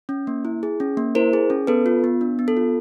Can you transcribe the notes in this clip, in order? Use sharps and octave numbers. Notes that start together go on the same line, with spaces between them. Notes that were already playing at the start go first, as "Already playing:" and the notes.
C#4
A#3
E4
G#4
C#4
A#3
E4 A#4 C5
G#4
C#4
B3 A4 B4
F4
B3
D4
B3
A4
F4